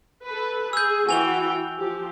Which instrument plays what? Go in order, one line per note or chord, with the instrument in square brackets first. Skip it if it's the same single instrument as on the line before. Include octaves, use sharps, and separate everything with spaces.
[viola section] A4 B4
[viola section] G#4 [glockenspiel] E6 G6
[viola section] E3 F#4 G5 [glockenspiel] G#5 F7 G7
[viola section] F3 G4